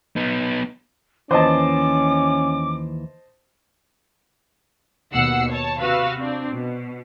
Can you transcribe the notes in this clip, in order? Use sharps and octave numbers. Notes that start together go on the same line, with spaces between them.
B3 D#4
D#2 E3 C#4 C5 D#5 A5 D6
D#2 B2 F#5 E6 C7 C#7
C#5 A5
C3 F#4 B4 F5 E6
C4 D4
B2